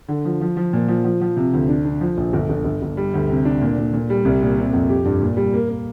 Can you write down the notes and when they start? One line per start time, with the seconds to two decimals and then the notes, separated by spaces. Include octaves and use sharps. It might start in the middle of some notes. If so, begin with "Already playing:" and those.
0.08 D3
0.25 F3
0.41 F3
0.57 F3
0.73 A#2
0.88 F3
1.04 F3
1.21 F3
1.37 C3
1.53 D2
1.69 D4
1.85 D4
2.01 F3
2.17 A#1
2.33 G1
2.49 G1
2.65 G1
2.82 G1
2.97 G3
3.14 D2
3.29 C3
3.45 D4
3.62 A#2
3.78 A#2
3.93 A#2
4.10 G3
4.25 C2
4.42 A#2
4.57 C3
4.73 F2
4.89 G4
5.05 G2
5.22 A#2
5.37 G3
5.53 A#3
5.69 A#3